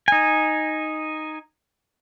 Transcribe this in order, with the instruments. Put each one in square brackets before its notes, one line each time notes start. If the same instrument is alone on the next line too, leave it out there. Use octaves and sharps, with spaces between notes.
[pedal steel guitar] D#4 G#5